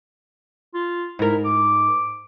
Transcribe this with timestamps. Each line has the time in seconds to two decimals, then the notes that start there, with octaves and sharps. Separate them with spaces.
0.74 F4
1.19 G#2 E4 A#4
1.45 D6